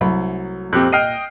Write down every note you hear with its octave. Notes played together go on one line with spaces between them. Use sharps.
C2 F#3 A3 B5
F2 A#2 C4 G4 F#6
D#5 G5 F6 C7 D#7